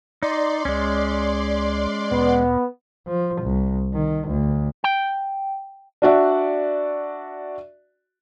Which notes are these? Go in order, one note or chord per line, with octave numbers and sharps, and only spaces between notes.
D#4 D5 C6
C#2 G#3 C#4
D2 A#2 B3
F3
C2
D#3
D2
G5
D4 F#4 D5 E5